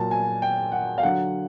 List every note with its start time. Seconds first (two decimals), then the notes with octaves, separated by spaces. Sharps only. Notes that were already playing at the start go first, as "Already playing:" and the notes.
Already playing: A#2 F#3 A5
0.11 G#5
0.42 G5
0.72 F#5
0.98 F5
1.03 D3 F#3 F#5